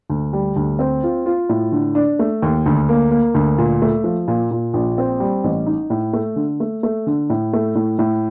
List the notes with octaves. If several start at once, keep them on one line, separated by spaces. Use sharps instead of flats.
D2
G3
D2
C4
F4
F4
A2
D3
D4
A3
D#2
D2
A#3
A#3
D2
A#2
A3
F3
A#2
A#2
A#1
C4
G3
A1
D#4
A2
A3
D3
A3
A3
D3
A2
A3
A2
A2